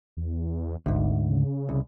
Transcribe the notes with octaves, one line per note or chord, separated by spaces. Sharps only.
E2
G#1 D2 G#2
C#3
C2